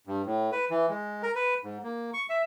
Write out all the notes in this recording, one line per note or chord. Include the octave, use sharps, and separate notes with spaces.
G2
A2
B4
E3
G#3
A#4
B4
G#2
A#3
C#6
E5